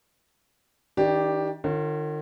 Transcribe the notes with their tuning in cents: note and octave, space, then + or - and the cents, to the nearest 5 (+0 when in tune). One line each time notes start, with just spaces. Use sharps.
D#3 +35 D4 +0 G4 +0
D#3 -45 F4 +0 C#5 -25